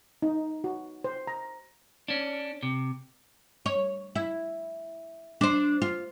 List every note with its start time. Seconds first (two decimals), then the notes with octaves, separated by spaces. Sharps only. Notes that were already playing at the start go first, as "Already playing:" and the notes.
0.22 D#4
0.64 F#4
1.04 C5
1.27 A#5
2.08 C#4 D4
2.63 C3
3.66 C#5
4.15 E4
5.41 D4 C5
5.82 F4